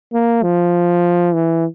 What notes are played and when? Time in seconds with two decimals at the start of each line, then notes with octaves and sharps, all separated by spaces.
0.13 A#3
0.43 F3
1.34 E3